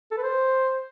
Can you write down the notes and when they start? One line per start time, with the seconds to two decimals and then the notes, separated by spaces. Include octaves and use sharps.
0.11 A4
0.17 B4
0.23 C5